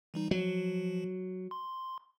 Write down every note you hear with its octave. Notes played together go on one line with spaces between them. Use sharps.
E3 G3 D#4
F3 F#3
C6